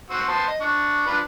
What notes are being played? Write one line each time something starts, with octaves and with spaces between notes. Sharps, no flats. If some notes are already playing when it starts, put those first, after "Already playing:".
F#4 C5 E6
B3 C5 A5
D#5
D4 C#6
F3 D4 B4